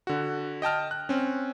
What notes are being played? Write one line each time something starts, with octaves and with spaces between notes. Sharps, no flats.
D3 F#4
D#5 G5 A5 F6
F#6
C4 C#4